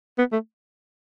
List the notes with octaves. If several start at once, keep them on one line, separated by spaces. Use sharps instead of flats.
B3
A3